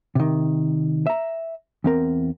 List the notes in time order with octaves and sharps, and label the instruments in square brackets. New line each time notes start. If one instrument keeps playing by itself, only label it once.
[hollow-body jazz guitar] C3 D#3
E5 A#5
E2 C4 A#4